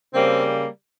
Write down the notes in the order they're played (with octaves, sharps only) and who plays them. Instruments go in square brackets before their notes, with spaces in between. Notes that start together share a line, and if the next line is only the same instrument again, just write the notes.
[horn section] C#3 G3 A#3 C4